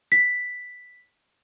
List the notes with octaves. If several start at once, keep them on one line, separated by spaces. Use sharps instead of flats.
B6